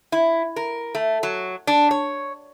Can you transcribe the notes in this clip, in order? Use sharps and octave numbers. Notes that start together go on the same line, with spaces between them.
E4
A#4
A3
F#3
D4
C#5